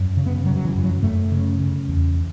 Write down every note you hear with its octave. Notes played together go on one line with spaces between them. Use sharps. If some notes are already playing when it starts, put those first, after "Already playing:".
Already playing: F#2
C#3
B3
C#3 F#3
F#3
E3
F#2
F#3
F#2 A3
C#3
C#3
E2